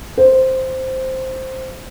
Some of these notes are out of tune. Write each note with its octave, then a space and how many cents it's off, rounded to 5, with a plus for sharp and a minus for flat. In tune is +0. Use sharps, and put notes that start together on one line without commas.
C5 +0